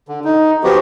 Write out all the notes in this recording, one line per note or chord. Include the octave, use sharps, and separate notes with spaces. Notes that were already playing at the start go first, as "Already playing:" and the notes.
D3
D#4
F3 B3 F#4 G4